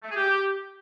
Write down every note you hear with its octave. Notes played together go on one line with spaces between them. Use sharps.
A3
G#4
G4